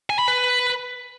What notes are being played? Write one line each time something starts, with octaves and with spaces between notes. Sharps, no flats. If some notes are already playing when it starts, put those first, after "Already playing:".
G#5
B5
B4